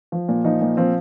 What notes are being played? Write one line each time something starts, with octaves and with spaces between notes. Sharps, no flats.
F3
A#2
F3 D#4
A#2
F3 C4